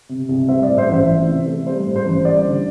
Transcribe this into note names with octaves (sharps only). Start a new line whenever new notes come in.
C3
C2
G3 C5 E5
A2 D5
C5 E5
A1 C5 E5
E3
C3
A3
G3 C5
A2
C5
A1
G3 D5
D3